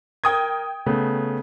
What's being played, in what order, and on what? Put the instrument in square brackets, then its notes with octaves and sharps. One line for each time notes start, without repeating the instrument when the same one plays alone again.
[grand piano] A#4 [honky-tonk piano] G5 D#6 G#6
[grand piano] C#3 A3 B3